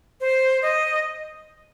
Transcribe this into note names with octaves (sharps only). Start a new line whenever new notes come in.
C5
D#5